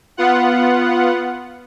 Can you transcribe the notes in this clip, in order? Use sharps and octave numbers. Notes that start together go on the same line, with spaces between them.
B3 F4 F#5